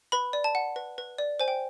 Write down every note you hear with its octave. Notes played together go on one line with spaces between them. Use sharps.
B4 B5
D5
A5
F#5
B4
B4
D5
C5 G#5
G5